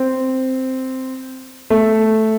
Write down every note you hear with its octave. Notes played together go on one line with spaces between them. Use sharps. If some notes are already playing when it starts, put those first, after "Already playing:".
Already playing: C4
A3